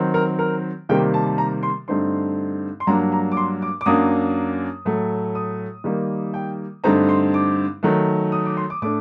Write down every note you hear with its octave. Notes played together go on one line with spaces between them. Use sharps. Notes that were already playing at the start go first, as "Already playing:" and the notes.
Already playing: D#3 F#3 C4
A#4
A#4
C3 D#3 G3 A#3 G5
A5
A5
A#5
C6
G2 D3 A3 C4 D#4 C6
C6
G2 F#3 A#3 D4 A#5
A#5
D6
C6
D6
D6
F#2 F#3 A#3 D4 D#6
A2 F#3 A3
D#6
D#3 G3 A#3
G5
G2 D3 A3 C4 D#4 A#5
C6
D6
D#3 F#3 A3
D#6
D6
C6
D6
A2 A3 D4 D6